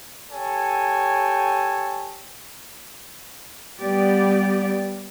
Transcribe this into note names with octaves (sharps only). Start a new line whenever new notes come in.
G4 A4 C#5 G5 G#5
G3 B3 G4 D5